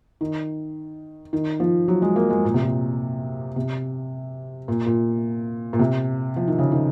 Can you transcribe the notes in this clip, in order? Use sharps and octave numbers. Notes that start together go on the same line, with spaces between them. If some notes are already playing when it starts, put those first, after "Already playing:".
D#3
D#3
F3
F#3
G#3
A#3
G#3
A#2
C3
A#2
C3
A#2
A#2
A#2
C3
F3
D#3
C#3
D#3